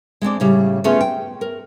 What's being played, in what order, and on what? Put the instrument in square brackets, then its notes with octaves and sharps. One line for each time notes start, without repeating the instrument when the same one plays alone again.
[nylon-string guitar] G#3 C4 D4 D5
A2 C#3 G3
A3 B3 C#4 F4 G#4
G5
A#4